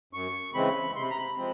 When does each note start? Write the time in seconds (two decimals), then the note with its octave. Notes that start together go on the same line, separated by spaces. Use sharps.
0.13 F#2 C#6
0.54 C#3 E3 G#3 C4 B5
0.96 C3 C6
1.03 B5
1.10 A#5
1.18 B5
1.37 F3 G#3 C4